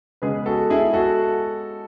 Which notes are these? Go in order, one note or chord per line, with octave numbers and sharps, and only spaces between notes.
C#3 G#3 B3 G#4 B4
F#4 A4
E4 G#4
F#4 A4